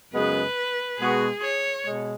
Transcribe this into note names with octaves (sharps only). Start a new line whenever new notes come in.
F#2 C#3 G#3 B3 B4
B2 G#3 B3 F#4 G#4
C#5
B2 G#3